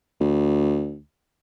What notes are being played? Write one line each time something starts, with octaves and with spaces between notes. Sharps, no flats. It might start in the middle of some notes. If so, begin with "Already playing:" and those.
D2